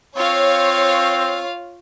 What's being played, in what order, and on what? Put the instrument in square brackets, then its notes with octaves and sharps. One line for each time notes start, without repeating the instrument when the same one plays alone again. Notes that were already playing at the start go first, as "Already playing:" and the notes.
[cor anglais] C4 [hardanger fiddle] F4 F5 [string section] C#5